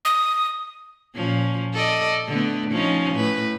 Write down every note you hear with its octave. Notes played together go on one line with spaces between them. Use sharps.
D#6
A#2 F3 C#4
A4 D5 D#5
D3 A3 B3
F3 C#4 D#4
A2 B4